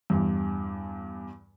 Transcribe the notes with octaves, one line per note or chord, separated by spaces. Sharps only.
E2 G2